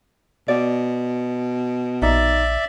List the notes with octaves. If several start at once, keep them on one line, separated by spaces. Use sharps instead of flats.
B2 D5
A#1 D#4 D5 E5